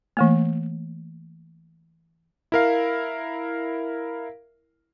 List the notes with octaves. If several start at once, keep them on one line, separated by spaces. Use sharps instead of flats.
E3 A3 A#3
E4 A#4 F5